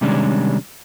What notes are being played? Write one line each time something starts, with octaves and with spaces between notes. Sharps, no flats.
C3 D#3 G3 G#3 C#4 D4